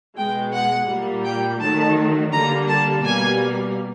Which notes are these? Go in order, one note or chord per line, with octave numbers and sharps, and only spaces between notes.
B2 G#3 G5
F#5
A#2 G3 A#3
G5
D#3 F#3 A3 A5
D3 G3 A#3 A#5
A5
B2 G3 A#3 G#5